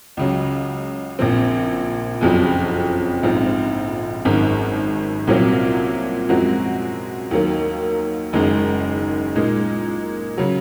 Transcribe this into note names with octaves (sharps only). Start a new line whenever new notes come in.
C#2 C#3 F#3
A#1 A#2 F3 C4
F#1 F2 C#3 F#3
A#1 G#2 F3 C4 F4
G#1 F#2 D#3
C2 A#2 F#3 C4 F4
F#2 F3 G#3 C4 F#4
D#2 D#3 F#3 A#3
F#1 F#2 D#3 G#3
A#2 G#3 D#4 A#4
C#3 F#3